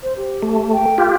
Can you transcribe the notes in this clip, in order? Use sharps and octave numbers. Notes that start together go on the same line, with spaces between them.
C5
G4
A3
G5
F4 G4